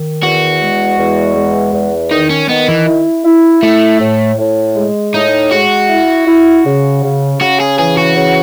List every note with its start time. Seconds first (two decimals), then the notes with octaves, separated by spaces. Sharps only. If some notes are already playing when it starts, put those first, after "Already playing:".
Already playing: D#3
0.23 E2 F#4
0.60 G#3
0.98 E2
1.36 G#3
1.74 E2
2.11 D#3 D#4
2.30 C#4
2.49 D#3 B3
2.68 E3
2.87 E4
3.25 E4
3.63 A3 E4
4.01 A2
4.39 A2
4.76 G#3
5.14 A2 D#4
5.52 G#3 F#4
5.90 E4
6.27 E4
6.65 C#3
7.03 C#3
7.41 C#3 F#4
7.60 G#4
7.79 E3 G#4
7.97 F#4
8.17 C#3